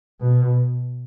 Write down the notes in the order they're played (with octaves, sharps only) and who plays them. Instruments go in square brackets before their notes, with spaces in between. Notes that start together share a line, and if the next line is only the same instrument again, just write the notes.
[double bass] B2